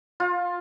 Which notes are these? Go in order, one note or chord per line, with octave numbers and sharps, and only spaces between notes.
F4